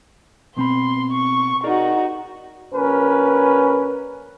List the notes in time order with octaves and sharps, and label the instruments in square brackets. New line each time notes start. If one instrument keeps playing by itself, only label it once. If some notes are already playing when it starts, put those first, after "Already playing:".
[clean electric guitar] B2 C4 B5 [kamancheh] C6
[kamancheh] C#6
[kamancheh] D#4 F#4 [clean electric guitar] G#4 A#4 D5
[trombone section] A#1 C#4 A#4 B4